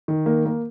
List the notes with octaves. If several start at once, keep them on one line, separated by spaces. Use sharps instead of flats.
D#3
A#3
A#3